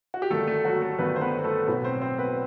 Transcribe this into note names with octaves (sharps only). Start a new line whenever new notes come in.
F#4
G4
G1 G2 D#3 A3 A4
A3 A4
F#3 F#4
A3 A4
G1 G2 D#3 B3 B4
C5
B3 B4
A3 A4
B1 A2 F#3 B3 B4
C4 C5
C4 C5
B3 B4